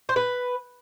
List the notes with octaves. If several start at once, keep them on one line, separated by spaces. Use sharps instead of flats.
C5
B4